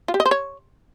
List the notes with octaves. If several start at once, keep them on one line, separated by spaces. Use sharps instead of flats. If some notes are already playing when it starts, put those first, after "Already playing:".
F4
G4
D#5
C5
C#5